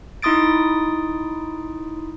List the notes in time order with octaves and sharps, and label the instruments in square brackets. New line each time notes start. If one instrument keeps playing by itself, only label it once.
[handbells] D#4 E4 C6 D#6 A6 D7